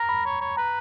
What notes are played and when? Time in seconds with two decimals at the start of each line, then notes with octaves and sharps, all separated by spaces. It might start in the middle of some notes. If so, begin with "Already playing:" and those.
Already playing: A#4 A#5
0.09 B5
0.26 C#5
0.41 C#5
0.57 B4 A#5